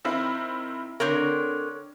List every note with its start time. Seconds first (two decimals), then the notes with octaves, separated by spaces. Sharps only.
0.05 D#3 C4 E4
1.00 D3 C4 A#4 C#5